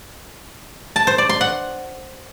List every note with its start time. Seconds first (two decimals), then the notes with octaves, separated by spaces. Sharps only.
0.96 A5
1.07 C5
1.18 D5
1.29 C6
1.41 F#5